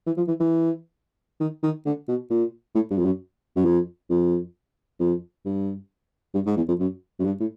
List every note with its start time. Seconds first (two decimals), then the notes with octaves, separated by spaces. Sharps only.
0.06 E3
0.17 F3
0.28 E3
0.40 E3
1.40 D#3
1.63 D#3
1.86 D3
2.08 B2
2.30 A#2
2.75 A2
2.91 G2
2.98 F2
3.06 F#2
3.56 F#2
3.65 F2
4.10 F2
5.00 F2
5.45 G2
6.35 G2
6.46 G#2
6.57 E2
6.68 F2
6.80 F#2
7.20 F#2
7.24 G2
7.40 A2